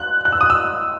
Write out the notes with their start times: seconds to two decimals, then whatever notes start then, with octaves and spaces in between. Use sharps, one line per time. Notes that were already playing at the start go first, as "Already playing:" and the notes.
Already playing: F#6
0.25 F#6
0.32 E6
0.41 D#6
0.50 E6